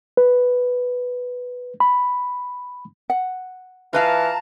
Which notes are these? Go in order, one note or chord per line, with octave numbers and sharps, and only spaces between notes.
B4
B5
F#5
E3 F4 B4 F5 A5 A#5